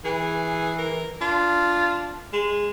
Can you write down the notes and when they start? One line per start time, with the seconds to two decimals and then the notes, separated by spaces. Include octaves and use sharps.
0.05 E3 G#4
0.78 A#4
1.21 D4 F4
2.33 G#3